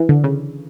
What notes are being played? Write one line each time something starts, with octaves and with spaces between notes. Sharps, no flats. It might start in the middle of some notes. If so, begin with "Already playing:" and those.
Already playing: E3
D3
C#3